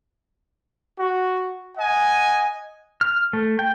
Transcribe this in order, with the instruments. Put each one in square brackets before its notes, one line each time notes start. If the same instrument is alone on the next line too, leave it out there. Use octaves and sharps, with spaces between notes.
[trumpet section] F#4
D#5 F#5 G#5
[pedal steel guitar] F6
A3
G5